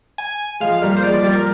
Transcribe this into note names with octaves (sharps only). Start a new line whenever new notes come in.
G#5
F3 G#3 F5
G3 A#3
C5
F3 G#3 D5
G3
A#4